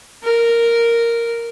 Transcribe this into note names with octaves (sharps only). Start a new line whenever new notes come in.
A#4